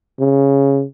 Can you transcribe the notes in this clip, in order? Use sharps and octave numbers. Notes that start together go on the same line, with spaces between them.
C#3